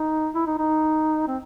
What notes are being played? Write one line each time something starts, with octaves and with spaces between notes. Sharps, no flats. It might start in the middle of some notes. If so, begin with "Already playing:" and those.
Already playing: D#4
E4
D#4
D#4
C4